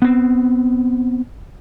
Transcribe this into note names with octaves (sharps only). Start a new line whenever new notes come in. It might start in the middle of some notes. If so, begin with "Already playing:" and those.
B3 C4